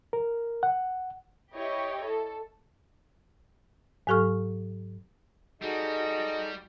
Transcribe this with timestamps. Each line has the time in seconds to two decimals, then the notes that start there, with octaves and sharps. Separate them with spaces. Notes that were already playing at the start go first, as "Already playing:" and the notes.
0.13 A#4
0.63 F#5
1.53 E4 G4 C#5 D#5
2.04 A4
4.07 G#2 F#3 G4 A4 C#6 F6
5.62 G3 D#4 F#4 G#4 A4 D#5